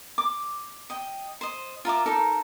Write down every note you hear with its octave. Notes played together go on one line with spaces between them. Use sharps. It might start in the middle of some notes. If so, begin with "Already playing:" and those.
D6
D#5 G5
C5 D#5
F4 A#4 E5 D6
D#4 A4 A#4